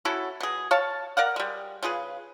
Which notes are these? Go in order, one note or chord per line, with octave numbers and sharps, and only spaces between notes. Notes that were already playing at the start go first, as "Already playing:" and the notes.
C#4 E4 F#4 A4
B2 G#4
C#5 F5 A5
A#4 D5 F5 F#5
G3 G#3
C#3 F4 G#4 B4